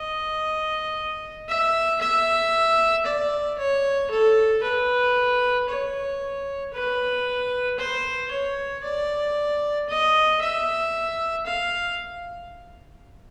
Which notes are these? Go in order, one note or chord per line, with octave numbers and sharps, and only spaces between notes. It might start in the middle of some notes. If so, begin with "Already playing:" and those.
Already playing: D#5
E5
E5
D5
C#5
A4
B4
C#5
B4
C5
C#5
D5
D#5
E5
F5